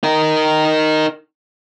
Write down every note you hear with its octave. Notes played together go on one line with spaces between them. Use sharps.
D#4 A#4